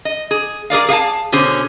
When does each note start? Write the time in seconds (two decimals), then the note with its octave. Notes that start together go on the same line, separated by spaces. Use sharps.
0.05 D#5
0.31 G#4
0.70 G#4 A#4 D5 F5
0.88 G#4 F5 G5 A5
1.32 B2 D3 C#4 G#4 C5